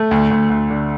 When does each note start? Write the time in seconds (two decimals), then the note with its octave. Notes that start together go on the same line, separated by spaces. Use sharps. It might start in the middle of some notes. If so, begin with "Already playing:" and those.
Already playing: A3
0.11 D2
0.31 D2
0.50 D2
0.70 D3